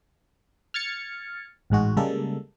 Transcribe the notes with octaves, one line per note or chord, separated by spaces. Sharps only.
F6 G#6 A6 C#7
A1 G#2 G#3 F#4
C#3 G3 G#3 A#3 A4